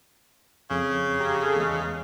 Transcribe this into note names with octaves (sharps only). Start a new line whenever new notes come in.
F2 C#3
G4 A#5
G#4 A4
E2 G#3